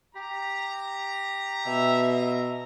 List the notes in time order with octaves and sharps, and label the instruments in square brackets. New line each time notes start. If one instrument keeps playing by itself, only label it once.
[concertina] G4 [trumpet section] A#5
[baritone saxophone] B2 [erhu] E5